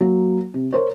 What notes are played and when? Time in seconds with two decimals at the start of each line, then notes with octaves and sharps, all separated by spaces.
0.01 F#3 A#3
0.54 C3
0.72 A#4 C5 C#5